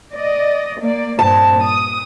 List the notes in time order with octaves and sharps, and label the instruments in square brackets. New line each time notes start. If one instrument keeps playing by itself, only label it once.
[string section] D5 D#5
A#3 D5
[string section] G2 A#2 C4 [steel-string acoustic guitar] A5
[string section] D#6